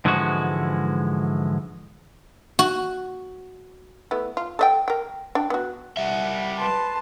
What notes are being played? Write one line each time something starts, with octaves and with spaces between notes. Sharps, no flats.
G#2 D3 E3 F3 G#3 F#4
F#4
A3 B3 E4
F4
A4 D#5 G5
A#4 G5
D4 G5
B3 F#4
G3 E5 F#5
B4 A5 C6